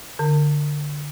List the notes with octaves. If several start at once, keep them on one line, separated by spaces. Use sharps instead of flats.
D3